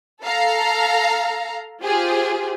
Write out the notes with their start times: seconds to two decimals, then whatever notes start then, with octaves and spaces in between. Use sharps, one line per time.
0.23 A4 F5 A#5
1.82 F4 G4 G#4 C5